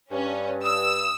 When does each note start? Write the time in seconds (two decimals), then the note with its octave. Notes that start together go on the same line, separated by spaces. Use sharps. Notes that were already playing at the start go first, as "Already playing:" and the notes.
0.11 G2 C#4
0.64 D#6 E6